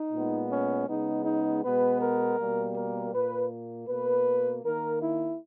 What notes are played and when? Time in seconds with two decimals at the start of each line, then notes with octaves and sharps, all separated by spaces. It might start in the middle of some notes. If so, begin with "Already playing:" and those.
Already playing: D#4
0.12 A#2 G#3 B3
0.50 C#4
0.88 C#3 G#3 B3 D#4
1.25 D#4
1.63 B2 G#3 B3 B4
2.01 A#4
2.38 B2 G3 A#3
2.75 A#4
3.12 A#2 A#3 B4
3.87 B2 A#3 B4
4.63 D#3 A#3 A#4
5.01 E4